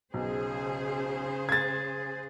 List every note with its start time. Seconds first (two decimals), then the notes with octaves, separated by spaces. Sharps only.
0.14 B1 C#3 G#4 C5
1.49 G#6 A6